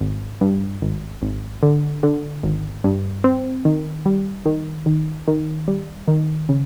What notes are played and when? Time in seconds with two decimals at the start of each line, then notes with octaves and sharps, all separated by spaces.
0.01 G#1
0.41 G2
0.82 G#1
1.22 G#1
1.63 D3
2.03 D3
2.43 G#1
2.84 G2
3.24 C4
3.65 D#3
4.05 G3
4.45 D#3
4.86 D#3
5.28 D#3
5.68 G3
6.08 D#3
6.49 C#3